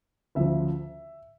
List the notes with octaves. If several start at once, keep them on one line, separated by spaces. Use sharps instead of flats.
D2 C#3 F3 E5